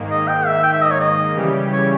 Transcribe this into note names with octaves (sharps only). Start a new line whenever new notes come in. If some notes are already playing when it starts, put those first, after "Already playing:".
Already playing: G#2 D#3 A#3
D#5
G5
E5
G5
E5
D#5
C#5
D#5
C#3 E3 G3 C#4 G4
C#5